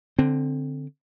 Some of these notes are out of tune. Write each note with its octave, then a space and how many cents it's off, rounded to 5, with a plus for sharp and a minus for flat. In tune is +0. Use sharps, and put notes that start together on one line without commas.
D3 +0 C4 +0